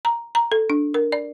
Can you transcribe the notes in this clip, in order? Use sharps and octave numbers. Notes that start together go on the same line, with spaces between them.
A#5
A#5
A4
D4
A#4
D5